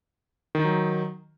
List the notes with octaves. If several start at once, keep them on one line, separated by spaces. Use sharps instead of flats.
D#3 F#3 D#4